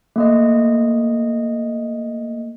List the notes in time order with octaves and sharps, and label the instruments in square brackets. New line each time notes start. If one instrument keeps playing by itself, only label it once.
[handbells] A3 A#3 D#5